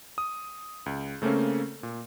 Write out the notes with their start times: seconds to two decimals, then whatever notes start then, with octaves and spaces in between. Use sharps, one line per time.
0.18 D#6
0.86 C#2
1.22 C#3 A3 A#3 C4 C#4
1.83 A#2